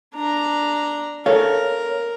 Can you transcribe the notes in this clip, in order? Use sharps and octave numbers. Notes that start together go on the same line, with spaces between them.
D4 A#5
A4 A#4 C#5 F5